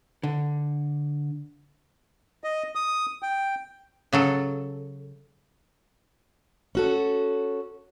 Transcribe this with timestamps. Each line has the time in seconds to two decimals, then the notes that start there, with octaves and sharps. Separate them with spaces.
0.23 D3
2.44 D#5
2.75 D#6
3.23 G5
4.13 C#3 F#3 A4
6.75 C#4 F#4 A4